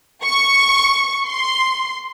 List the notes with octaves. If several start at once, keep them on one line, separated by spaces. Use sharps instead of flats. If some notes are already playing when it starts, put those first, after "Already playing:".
C#6
C6